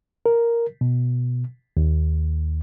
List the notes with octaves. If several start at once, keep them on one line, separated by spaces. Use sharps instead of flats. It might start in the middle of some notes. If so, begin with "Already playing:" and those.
A#4
B2
D#2